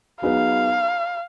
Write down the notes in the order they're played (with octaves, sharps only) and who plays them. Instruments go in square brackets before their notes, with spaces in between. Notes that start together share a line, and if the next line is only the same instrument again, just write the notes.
[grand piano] F#3 B3 D#4 G#4 B4 [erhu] F5